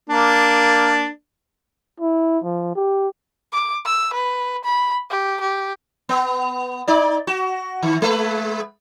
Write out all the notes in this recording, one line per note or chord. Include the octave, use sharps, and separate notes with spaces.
A#3 D4
E4
F3
G4
D6
E6
B4
B5
G4
G4
B3
D#4 D5
F#4
D#3
G#3 B4